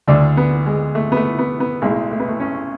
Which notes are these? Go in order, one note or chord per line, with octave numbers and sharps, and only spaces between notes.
D2 D3 D4
B3
G#3
A3
B3
A3
B3
B3
B1 A2 G#3
A3
B3
A3
C#4